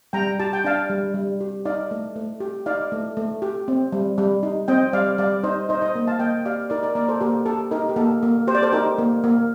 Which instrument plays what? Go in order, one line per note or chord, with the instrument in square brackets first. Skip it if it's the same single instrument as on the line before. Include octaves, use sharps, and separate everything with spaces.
[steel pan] G3 G5 A#5
G4 A5
G5
D4 F5 A5
G3
G3
G4
D#4 D5 F5
A3
A3
G4
D#4 D5 F5
A3
A3
G4
C4
G3
G3
D#4
C4 D#5 G5
G3 D5 F5
G3 D5 F5
D#4 C5 D#5
D#4 C5 D#5
C5 D#5
A#3
F5 A5
A#3 D#5 G5
G4 D5 F5
D#4 A#4 D5
A#4 D5
A#3 A#4 D5
A4 C5
A#3 G4 A#4
G4 A4
D#4 G4 A#4
G4
A#3 A4
A#3
G4 C5
D5
A4 C5
D#4 G4 A#4
A#3
A#3